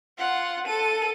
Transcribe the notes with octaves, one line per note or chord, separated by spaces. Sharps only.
F4 F#5
A4 D#7